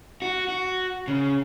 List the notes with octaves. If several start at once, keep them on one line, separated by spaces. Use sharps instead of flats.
F#4
F#4
C#3